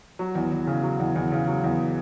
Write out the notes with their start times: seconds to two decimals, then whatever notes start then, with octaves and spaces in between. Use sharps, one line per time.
0.19 F#3
0.35 E2
0.52 E2
0.67 C#3
0.83 F#3
1.00 E2
1.16 E2
1.32 C#3
1.48 F#3
1.63 E2